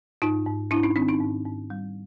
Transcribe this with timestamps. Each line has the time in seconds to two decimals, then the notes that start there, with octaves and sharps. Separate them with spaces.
0.22 G#2 D#4 F4
0.46 G#2
0.71 G#2 D4 E4
0.83 C#4 D#4
0.96 D#3 C4 D4
1.08 C#4 D#4
1.21 G#2
1.46 G#2
1.70 G3